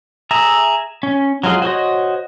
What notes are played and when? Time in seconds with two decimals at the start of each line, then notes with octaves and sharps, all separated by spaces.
0.31 G#4 E5 A#5
1.03 C#4
1.44 F#3 G#3 F4 G#4
1.62 F#4 C5 C#5 D#5